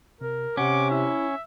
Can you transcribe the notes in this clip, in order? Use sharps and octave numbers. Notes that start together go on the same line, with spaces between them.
C3 A#4
C3 C#4 F#5 D6
E4 E5